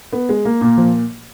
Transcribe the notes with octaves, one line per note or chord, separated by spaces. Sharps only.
B3
G#3
A#3
A#2
F3